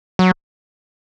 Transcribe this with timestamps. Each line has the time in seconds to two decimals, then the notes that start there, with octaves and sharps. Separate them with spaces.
0.19 F#3